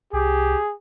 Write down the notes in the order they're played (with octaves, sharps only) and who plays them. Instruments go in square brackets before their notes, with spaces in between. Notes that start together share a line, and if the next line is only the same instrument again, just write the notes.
[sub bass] C2 [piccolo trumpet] G4 [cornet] G#4